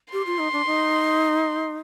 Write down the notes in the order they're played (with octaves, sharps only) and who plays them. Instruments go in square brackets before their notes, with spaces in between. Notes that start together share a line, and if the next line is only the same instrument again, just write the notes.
[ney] G4 [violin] C6
[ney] F4
D#4
D4
D#4